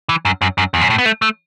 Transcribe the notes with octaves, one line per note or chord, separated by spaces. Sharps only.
E3
F#2
F#2
F#2
E2
F#2
A2
B3
A3
A3